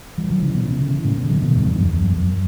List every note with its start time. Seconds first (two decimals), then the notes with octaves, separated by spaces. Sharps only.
0.18 E3 G3
0.30 D3 F#3
0.42 C#3 E3
0.55 B2 D3
0.67 C#3 E3
0.80 C#3 E3
1.05 A2 C#3
1.17 B2 D3
1.29 D3 F#3
1.42 B2 D3
1.54 E2 G2
1.67 E2 G2
1.79 F#2
1.92 E2
2.04 F#2
2.17 F#2